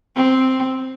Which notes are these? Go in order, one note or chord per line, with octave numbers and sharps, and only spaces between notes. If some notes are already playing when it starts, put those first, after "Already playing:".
C4